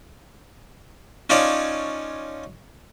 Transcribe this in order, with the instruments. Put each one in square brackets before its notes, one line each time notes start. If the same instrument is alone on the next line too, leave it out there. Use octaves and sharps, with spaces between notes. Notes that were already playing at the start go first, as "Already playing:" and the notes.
[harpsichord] C#4 D#4 F4 C#5 D5 A5